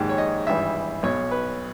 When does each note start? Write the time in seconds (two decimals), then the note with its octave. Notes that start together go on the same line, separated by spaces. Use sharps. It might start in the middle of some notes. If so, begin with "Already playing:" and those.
Already playing: A#1 G#2 D#3 G4
0.09 C#5
0.18 D#5
0.47 G#1 G2 E3 E5
1.03 B1 B2 C#5
1.31 B4